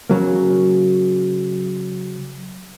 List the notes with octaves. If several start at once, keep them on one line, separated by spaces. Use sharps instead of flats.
C#3 F#3 A#3